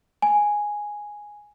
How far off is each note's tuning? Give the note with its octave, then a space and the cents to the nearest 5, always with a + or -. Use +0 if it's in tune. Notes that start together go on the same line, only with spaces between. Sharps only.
G#5 +0